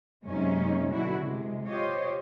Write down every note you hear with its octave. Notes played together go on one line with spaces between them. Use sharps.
F#2 C3 G#3 A#3 C#4 D#4
F#2 B2 D3 E4 F#4
C3 G#3
F4 G4 C5 C#5 D#5